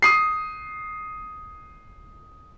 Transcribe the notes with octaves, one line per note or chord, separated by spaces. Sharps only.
D#6 C7